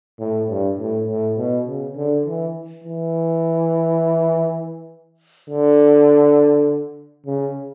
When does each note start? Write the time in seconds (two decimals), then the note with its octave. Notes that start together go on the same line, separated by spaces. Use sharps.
0.19 A2
0.49 G2
0.79 A2
1.08 A2
1.38 B2
1.67 C#3
1.97 D3
2.26 E3
2.84 E3
5.50 D3
7.26 C#3